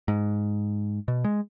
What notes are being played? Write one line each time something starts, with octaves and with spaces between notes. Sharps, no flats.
G#2
B2
G#3